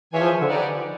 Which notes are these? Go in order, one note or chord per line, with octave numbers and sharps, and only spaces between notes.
E3 F4 G#4 C#5 E5 G#5
F3
D3
D#4 G4 B4 D5 F#5